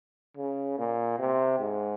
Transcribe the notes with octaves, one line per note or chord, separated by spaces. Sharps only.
C#3
A#2
C3
G#2